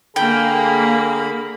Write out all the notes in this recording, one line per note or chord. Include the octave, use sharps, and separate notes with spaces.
D3 A#3 G#4 G5 B5